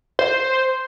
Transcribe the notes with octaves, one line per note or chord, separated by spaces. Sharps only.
C5